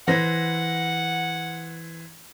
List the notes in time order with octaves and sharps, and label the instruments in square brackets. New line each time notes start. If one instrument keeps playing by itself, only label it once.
[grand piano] E3 C5 A#6 [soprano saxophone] F#5